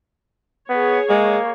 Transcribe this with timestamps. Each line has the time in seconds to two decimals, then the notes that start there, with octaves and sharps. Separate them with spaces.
0.70 B3 G#4 C#5
1.10 G#3 A#3